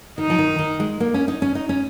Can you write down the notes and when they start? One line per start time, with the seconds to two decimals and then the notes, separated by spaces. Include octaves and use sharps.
0.18 D#3 D#4
0.30 F3
0.38 D#3
0.59 D#3
0.80 G#3
1.00 A#3
1.14 C#4
1.28 D#4
1.42 C#4
1.55 D#4
1.69 C#4